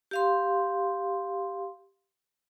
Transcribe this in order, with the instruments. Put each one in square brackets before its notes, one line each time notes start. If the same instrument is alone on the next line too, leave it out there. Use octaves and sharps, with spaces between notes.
[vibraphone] G4 F5 C6